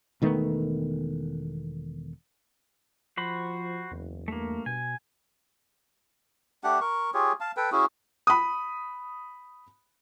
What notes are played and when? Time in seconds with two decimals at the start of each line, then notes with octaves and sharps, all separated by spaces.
0.22 E1 D#3 A3 B3
3.17 F3 F#4 C5 B5
3.91 F#1 E2
4.28 G2 A3 A#3
4.66 B2 G#5
6.64 A3 D4 G4 F#5
6.81 A#4 C#6
7.14 F4 G4 G#4 C#5
7.40 F5 A5
7.57 A4 B4 G5
7.72 C#4 E4 F#4 G#4
8.27 B5 D#6